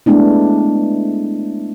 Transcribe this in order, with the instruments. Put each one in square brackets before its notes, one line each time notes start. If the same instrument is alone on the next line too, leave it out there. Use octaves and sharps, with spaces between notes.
[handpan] G#3 A3 B3 D4 E4